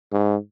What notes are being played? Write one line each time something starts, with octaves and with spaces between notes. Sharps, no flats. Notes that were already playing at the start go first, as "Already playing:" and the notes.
G#2